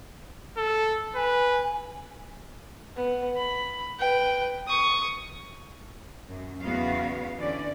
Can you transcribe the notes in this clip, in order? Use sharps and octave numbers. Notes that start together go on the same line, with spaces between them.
A4
B4 G#5
B3
B5
B4 G5
C#6 D#6
F#2
E2 C#3 B3 F#4 F5
D3 E3 C#4 D5